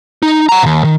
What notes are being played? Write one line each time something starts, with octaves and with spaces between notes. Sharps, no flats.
D#4
F#5 A#5
D#2 B2
D#3